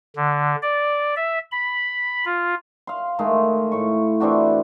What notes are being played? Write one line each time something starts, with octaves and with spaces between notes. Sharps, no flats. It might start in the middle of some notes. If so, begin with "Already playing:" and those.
D3
D5
E5
B5
F4
F5 C6
D#3 G#3 A3
A2 C#6
E3 C4 D4 F#4